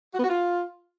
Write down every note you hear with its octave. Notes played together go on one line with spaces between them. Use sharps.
F#4
B3
F#4
F4